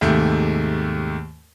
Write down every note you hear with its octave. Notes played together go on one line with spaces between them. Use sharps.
D#2 G#2 C3 A3